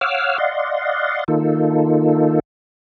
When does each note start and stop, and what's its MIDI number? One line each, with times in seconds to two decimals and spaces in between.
0.01 0.38 73
0.01 0.38 77
0.01 0.38 78
0.01 0.38 86
0.01 0.38 88
0.01 0.38 89
0.38 1.24 74
0.38 1.24 75
0.38 1.24 77
0.38 1.24 78
0.38 1.24 84
1.28 2.40 51
1.28 2.40 58
1.28 2.40 63
1.28 2.40 65
1.28 2.40 69